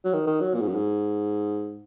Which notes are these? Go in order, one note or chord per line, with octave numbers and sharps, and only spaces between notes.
F#3
D#3
D#3
F#3
A#2
G#2
F#2
G#2